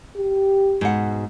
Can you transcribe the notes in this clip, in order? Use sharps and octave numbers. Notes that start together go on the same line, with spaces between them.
G4
G#2 B2 F#5